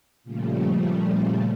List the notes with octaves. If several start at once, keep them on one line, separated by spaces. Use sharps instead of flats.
A#2 C#3 F3 G3 A3